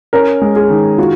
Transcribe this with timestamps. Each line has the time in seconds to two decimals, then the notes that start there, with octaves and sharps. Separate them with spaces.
0.13 C#4 A#4
0.42 G#3
0.56 G#4
0.70 D#3
0.98 F4 F#4